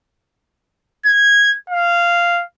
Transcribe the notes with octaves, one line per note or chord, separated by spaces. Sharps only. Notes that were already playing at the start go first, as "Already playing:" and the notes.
G#6
F5